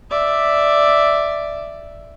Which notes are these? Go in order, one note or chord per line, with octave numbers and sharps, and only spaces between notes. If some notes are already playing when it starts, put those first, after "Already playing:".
D5 E5